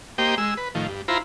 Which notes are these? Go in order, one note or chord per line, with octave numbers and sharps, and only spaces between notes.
A#3 G4 C5 D#5 G5
G#3 E6
B4
A2 D#3 F3
G2
E4 F4 C5 A#5 B5